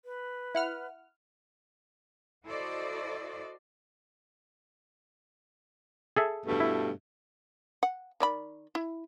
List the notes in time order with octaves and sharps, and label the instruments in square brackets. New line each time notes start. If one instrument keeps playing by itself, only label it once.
[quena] B4
[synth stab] E4 F#5 F6
[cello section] E4 F#4 A4 C5 D5 D#5
[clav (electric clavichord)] G#4 A4 E5
[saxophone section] G2 B2 A3
[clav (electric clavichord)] E4
[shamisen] F#5
D#3 D5 B5
E4